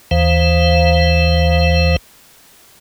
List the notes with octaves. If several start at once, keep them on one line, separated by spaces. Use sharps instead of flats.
D#2 E3 C5 F5